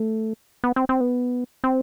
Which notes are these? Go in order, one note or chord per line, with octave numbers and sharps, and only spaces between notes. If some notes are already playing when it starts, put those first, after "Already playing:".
Already playing: A3
B3
C4
C4
B3
C4